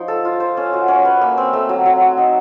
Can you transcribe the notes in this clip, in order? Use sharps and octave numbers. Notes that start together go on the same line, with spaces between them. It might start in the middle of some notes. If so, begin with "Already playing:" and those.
Already playing: F3 D#4 C#5
A4
F4
C5
C#4
F#4
C#4
B4
A#3
C4
A3
F#3
F#3
F#4
D#4